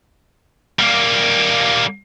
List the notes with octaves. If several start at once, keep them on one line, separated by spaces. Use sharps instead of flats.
G3 A#3